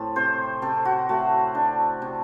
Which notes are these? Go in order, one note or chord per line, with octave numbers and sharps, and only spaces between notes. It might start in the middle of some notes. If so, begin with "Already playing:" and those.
Already playing: A2 C4 A5
C3 C5
C3 A4
F#4
A3 F#4
D4
C3